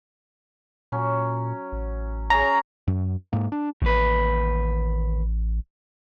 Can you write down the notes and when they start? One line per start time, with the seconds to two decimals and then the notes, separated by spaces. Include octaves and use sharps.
0.92 A#2 F#3 C#4
1.72 A1
2.30 C#4 G#4 A#5
2.88 F#2
3.33 G#2 A#3
3.52 D4
3.82 A1 D#2 B4